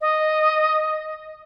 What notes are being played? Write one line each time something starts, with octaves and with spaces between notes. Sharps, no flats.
D#5